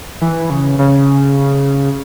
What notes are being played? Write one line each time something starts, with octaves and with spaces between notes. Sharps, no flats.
E3
C#3
C#3